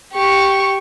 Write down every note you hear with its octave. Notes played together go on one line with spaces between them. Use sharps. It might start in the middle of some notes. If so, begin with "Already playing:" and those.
G4 C#6